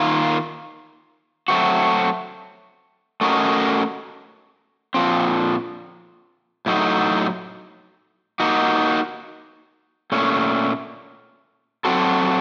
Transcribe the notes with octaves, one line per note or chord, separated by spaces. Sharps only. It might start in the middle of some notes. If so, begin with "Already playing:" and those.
Already playing: D#3 A#3 F4
F#3 A3 C4 F#4
A3 C#4 F#4 A#4 D#5
A#2 F3 C4
A2 F#3 A3 D#4
A#3 D#4 F#4
A#2 A3 C#4
F#3 C4 F#4 A4